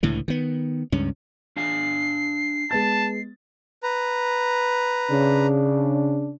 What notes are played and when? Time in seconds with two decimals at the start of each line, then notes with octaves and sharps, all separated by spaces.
0.03 C#2 A2 D3 E3
0.28 D#3 B3
0.92 C#2 G2 C#4
1.57 D4 F5 G#5 C7
2.71 G#3 B3 A5 A6
3.83 B4 A#5
5.11 C#3 D4